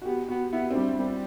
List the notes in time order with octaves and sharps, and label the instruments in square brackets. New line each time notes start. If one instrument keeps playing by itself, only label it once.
[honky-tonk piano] F#4
[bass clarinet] B3 [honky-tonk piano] G4
[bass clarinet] B3 [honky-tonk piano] F#4
[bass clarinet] B3 [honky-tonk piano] E4
[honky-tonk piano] C4
[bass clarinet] G3 [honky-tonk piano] D4
[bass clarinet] G3 [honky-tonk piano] C4